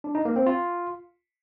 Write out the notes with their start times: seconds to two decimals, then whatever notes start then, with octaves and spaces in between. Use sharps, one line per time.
0.04 D4
0.15 D#4
0.25 A#3
0.36 C4
0.46 F4